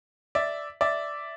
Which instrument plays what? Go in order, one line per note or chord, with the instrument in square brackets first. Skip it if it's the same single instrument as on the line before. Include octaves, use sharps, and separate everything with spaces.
[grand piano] D5 E5
D5 E5